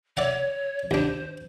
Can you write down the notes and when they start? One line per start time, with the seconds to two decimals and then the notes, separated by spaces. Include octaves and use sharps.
0.17 C#5 D5 E5 F#5
0.91 D#2 D4 C5